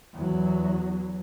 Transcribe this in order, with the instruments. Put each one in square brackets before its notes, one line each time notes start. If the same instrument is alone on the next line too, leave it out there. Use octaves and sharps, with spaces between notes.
[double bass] E2 F#3